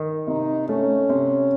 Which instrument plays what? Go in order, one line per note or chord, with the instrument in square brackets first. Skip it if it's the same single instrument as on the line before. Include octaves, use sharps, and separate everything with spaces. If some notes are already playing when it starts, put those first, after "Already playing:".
Already playing: [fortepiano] D#3
[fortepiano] C3 [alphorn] D#4
[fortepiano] A3 [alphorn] C#4
[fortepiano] C3